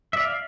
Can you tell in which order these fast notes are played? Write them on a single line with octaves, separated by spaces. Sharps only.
E5 D5 F5